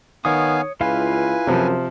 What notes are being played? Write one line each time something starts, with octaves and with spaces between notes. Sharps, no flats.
D#3 B3 C#5 F5 G#5 D#6
C#2 E4 F4 B4 F5 G#5
F#2 C3 F3